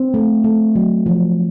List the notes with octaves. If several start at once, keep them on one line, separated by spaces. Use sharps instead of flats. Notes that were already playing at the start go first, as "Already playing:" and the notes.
Already playing: C4
A3
A3
F#3
F3